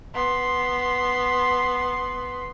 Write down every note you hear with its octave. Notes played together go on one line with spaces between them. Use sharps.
B3 C6